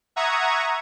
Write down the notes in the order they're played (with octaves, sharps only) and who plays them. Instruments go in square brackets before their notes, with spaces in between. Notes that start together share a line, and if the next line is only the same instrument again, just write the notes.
[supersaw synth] E5 F#5 A#5 C#6 D#6 G#6